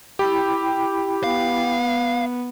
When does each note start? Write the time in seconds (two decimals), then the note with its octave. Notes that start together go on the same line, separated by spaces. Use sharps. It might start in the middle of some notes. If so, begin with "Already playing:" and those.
0.19 E4 G4 G5 B5
1.24 B3 F5